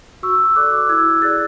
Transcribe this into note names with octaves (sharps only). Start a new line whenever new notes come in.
F#4 C#6 E6
A4 D5 D6 F#6
E4 E6 G#6
G#4 D5 F#6 A6